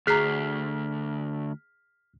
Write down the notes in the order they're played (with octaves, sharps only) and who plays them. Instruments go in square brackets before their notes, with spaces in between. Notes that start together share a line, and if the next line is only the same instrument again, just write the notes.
[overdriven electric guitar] D2 [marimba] G#4 A#5 [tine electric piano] F6 B6 C7